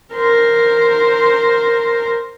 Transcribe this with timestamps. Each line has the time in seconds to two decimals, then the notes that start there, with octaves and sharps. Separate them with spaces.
0.14 A#4 C5